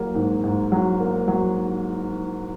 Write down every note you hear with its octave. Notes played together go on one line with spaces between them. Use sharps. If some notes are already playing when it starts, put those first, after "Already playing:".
Already playing: F#3 A#3
G#2
G#2
F#3
A#3
F#3